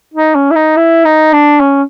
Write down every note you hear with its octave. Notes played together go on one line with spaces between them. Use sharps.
D#4
C#4
E4
D#4
E4
D#4
D4
C#4